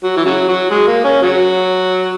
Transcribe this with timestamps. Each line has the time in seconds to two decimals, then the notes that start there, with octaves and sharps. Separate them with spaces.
0.04 F#3
0.17 E3
0.25 C#3 F#3
0.48 F#3
0.71 G#3
0.88 A#3
1.04 C#4
1.22 C#3 F#3